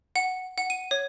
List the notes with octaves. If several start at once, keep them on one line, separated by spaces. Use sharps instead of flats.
F#5
F#5
D#7
C#5